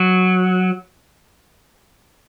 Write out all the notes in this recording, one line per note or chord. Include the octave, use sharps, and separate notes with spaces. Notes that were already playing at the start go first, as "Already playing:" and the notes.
Already playing: F#3